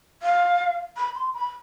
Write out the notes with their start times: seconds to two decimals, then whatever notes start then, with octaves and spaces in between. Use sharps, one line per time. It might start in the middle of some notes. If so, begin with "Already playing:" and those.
0.23 F5
0.97 B5
1.15 C6
1.34 B5